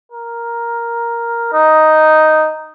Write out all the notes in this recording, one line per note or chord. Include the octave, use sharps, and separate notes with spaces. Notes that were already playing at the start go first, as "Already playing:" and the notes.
A#4
D#4